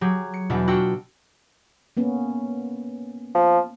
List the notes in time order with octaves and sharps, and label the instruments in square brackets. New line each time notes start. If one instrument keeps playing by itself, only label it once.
[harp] F#3 G4 G#4
C#7
E2 B2 G3 D4 E5
D4 F4 F#4 G5 E6 C#7
[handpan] A#3 B3 C#4
[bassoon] F3